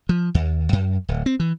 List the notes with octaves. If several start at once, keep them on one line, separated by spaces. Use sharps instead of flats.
F3
D#2
F#2
D1
C4
E3